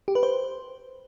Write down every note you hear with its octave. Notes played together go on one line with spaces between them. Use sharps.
G4
B4
C5